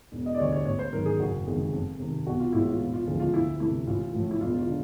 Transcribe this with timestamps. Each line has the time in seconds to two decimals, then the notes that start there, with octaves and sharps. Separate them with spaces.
0.12 E1
0.26 D#5
0.34 D5
0.40 D2 D3 G3 C#5
0.52 C#5
0.66 A1 C#5
0.79 C5
0.93 G#2 D#3 F#3 A#4
1.06 G#4
1.19 F#1 F#4
1.47 F2 C3 D#3 G#3
1.73 F2
1.99 C3 D#3
2.26 B1 F#4
2.40 F4
2.53 A2 E3 G#3 E4
2.66 F4
2.81 E1
2.94 F4
3.07 D2 C#3 F3 G#3
3.20 F4
3.33 D2 E4
3.60 C3 E3 A3 E4
3.87 A1 F4
4.14 A2 F3 A3
4.31 E4
4.41 E1 F4
4.59 F4
4.67 D3